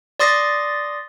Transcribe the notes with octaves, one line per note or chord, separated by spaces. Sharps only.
D5 C6 D#6 A6 A#6